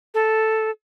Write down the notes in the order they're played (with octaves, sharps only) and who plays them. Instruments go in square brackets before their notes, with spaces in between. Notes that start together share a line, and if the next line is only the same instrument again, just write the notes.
[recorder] A4